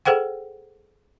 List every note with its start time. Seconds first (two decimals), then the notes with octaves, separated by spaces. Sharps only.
0.05 G#4 A4 C5 F#5 G5